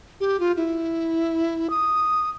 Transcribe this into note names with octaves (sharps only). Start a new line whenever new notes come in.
G4
F4
E4
D#6